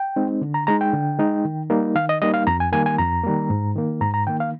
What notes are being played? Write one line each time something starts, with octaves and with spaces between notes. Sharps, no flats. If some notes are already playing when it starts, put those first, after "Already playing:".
Already playing: G5
G#3 C4 D#4
D3
A#5
G#3 D#4 A#5
G5
D3
G#3 D#4
D#3
G3 A#3 D#4
D#3 F5
D#5
G3 A#3 D#4 D#5
F5
F2 A#5
G#5
D#3 G3 A#3 G#5
G#5
F2 A#5
D#3 G3 A#3
G#2
D#3 A#3
G#2 A#5
A#5
D#3 A#3 G5
F5